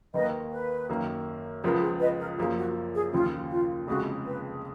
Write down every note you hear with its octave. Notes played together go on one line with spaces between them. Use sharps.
D#2 D#3 A#3 B4 D#5
B4
F#2 D#3 A#3
C#2 C#3 F3 B3 F4 A#4
G#4
B4 D#5
A#4
F#2 F3 A#3 G#4
F#4
G#4
D#2 C#3 F3 F4
F4
F1 F2 C#3 G#3 F#4
B4